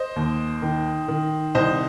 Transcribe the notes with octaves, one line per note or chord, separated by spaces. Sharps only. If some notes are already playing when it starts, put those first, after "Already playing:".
Already playing: C5 D#5
D#2
D#3
D#3
C2 C5 D#5